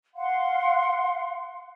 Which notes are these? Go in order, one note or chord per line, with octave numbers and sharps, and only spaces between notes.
F5 F#5 C6